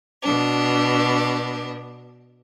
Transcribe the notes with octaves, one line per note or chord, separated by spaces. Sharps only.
B2 D4